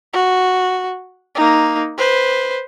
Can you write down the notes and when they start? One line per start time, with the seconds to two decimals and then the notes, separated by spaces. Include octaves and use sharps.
0.13 F#4
1.35 A#3 D#4
1.98 B4 C5